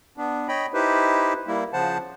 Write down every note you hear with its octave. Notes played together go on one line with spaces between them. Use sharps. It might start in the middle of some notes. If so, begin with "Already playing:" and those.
B3 D4
C#5 D#5 G5 B5
D#4 E4 G4 B4 C5
G3 A#3 E4
C#3 F3 C5 F#5 A5